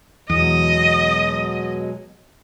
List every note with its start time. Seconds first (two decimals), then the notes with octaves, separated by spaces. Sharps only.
0.30 E2 B2 F#3 G#3 D#5 D#6